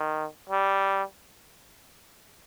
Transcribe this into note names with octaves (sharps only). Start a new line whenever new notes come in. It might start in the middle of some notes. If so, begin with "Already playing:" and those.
Already playing: D#3
G3